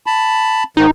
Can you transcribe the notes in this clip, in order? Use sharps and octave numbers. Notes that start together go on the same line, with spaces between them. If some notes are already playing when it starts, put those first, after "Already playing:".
A5 B5
G#2 D#3 D#4